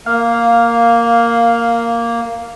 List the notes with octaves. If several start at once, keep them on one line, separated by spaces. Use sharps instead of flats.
A#3 F5